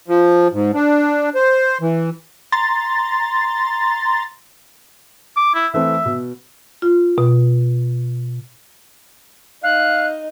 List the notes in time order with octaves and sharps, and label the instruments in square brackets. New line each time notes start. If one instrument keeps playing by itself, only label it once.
[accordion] F3
G#2
D4
C5
E3
[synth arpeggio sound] A#5 C6 A6
[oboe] D6
E4
[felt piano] E3 A3 C4 [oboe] E5
[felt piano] B2
[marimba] F4
B2
[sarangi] D#4 [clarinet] F5 [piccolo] F#6